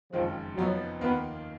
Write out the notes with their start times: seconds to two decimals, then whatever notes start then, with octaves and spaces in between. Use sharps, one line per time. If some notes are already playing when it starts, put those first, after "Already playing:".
0.12 F#1 F2 D#3 F3 G#3
0.56 F1 F2 F3 F#3 B3 D#4
1.00 D#2 D#3 A#3 B3 F4